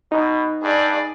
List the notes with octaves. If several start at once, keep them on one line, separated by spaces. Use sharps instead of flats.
B2 D#4
G2 G#4 D5